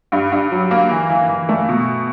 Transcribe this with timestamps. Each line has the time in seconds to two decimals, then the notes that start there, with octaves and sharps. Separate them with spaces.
0.12 G2
0.32 G2
0.52 F#3
0.71 A#3
0.91 E3
1.09 E3
1.29 E3
1.49 A3
1.68 B2